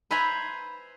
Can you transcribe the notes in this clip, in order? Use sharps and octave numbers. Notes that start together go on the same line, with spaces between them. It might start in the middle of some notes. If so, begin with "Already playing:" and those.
B4 C5 E5 G#5 A#5 B5